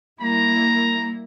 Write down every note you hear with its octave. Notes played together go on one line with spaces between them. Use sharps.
G3 A#3 E4 A#5